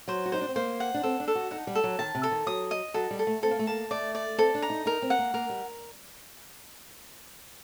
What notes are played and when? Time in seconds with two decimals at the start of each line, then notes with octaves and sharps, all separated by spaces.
0.08 F#3 C5
0.26 F#4
0.32 D#4 C5
0.41 D4
0.48 C4
0.56 A#3 C5
0.80 F#5
0.94 D4
1.03 C4 A4
1.20 D4
1.28 A4
1.35 F#4
1.51 D#4 F#5
1.67 G3
1.75 A4
1.84 F#3
1.99 D#3 A5
2.15 C3
2.23 A4
2.31 D#3
2.46 F#3 D#6
2.71 D#5
2.94 F#3 A4
3.11 G3
3.19 A4
3.27 A3
3.42 C4 A4
3.51 A#3
3.59 A3
3.67 A#3 A5
3.91 A3 D5
4.15 D5
4.38 C4 A4
4.55 D4
4.62 A#5
4.70 D#4
4.86 D#4 A#4
5.02 C4
5.10 F#5
5.19 A#3
5.34 A#3 A#4
5.49 G3